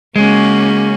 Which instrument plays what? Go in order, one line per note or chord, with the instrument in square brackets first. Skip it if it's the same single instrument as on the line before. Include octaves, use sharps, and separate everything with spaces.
[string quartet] C#3 A#3 C#4 F#4 [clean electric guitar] G#3